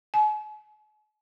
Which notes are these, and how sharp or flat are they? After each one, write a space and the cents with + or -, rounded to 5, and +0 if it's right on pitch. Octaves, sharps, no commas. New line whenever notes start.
G#5 +45